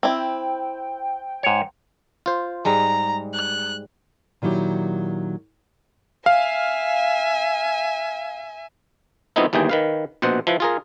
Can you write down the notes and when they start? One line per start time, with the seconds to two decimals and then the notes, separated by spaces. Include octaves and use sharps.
0.03 C4 E4 G5
1.43 G#2 C#5
2.26 F4 C5
2.65 G#2 G3 G#3 A#5
3.34 F#6
4.42 A#2 D#3 F#3 E4 G4
6.26 E5 F5 G#5
9.36 F2 G#2 B3 C4 D#4 E4
9.53 G1 D#2 E3 G#4 G5
9.69 D#3 B4 F5
10.22 A#1 B2 C5 F#5
10.47 F3 E4 B4
10.60 F4 G#4 A#4